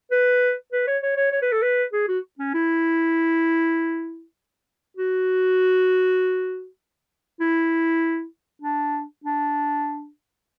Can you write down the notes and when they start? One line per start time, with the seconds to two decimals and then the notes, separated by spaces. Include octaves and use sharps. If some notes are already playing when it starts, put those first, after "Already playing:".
0.11 B4
0.72 B4
0.87 C#5
1.03 C#5
1.17 C#5
1.32 C#5
1.42 B4
1.52 A4
1.62 B4
1.93 G#4
2.08 F#4
2.39 C#4
2.54 E4
4.97 F#4
7.40 E4
8.62 D4
9.24 D4